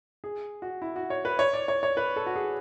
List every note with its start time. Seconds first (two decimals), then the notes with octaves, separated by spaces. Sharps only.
0.24 G#4
0.62 F#4
0.82 E4
0.96 F#4
1.10 C#5
1.25 B4
1.39 C#5
1.53 D5
1.68 C#5
1.83 C#5
1.97 B4
2.16 A4
2.26 F#4
2.36 G#4